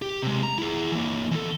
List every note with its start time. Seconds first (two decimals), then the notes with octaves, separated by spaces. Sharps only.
0.02 G4
0.23 C3 G#3
0.43 A#5
0.58 E4 G#4
0.92 E3 A#3
1.31 E2 A4